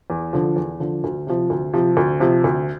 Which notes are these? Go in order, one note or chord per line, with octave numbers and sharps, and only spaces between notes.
E2
D3 F3
E2
D3 F3
D2
C3 F3
D2
C3 F3
D2
C3 F3
D2